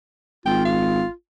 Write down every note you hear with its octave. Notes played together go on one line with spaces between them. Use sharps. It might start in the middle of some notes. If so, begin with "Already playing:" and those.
G#1 F4 G5
F5